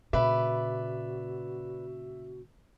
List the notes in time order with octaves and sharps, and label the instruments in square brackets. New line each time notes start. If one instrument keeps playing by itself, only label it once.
[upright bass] A#2 C#3 [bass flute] F#4 [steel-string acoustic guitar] B4 D5 [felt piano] E5